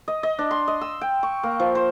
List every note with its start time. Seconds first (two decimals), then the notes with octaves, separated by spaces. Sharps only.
0.08 D#5
0.23 D#5
0.39 D4
0.51 C6
0.68 D#5
0.81 E6
1.01 G5
1.23 C#6
1.43 A#3
1.60 F3
1.75 C5